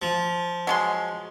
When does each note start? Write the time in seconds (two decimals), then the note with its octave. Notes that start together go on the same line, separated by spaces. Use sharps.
0.02 F3
0.67 F#3 G#3 C6